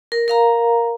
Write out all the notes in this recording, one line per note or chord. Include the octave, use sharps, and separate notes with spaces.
A#4
A#4 F5 A#5